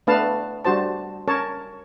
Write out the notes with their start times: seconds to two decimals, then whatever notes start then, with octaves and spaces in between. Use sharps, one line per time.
0.07 A3 B3 D4 B4 F5 A5
0.65 G3 D4 F#4 C5 A5
1.28 C#4 A#4 C#5 A5